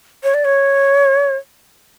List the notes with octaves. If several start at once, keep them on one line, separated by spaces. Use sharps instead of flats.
C#5
D5
C#5